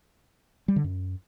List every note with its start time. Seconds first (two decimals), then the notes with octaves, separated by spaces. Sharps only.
0.68 G3
0.76 D3
0.84 F#2